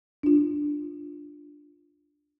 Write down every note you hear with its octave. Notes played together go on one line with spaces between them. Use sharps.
D4 F4